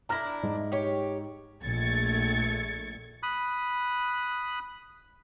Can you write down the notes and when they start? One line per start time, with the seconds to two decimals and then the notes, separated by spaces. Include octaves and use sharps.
0.09 D4 E4 A#5 F6 A#6
0.43 G#2
0.72 G4 C#5
1.64 A#1 A3 G#6 A6 C#7
3.23 B5 D#6 F#6